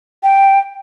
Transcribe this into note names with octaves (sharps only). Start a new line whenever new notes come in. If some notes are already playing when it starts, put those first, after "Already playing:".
G5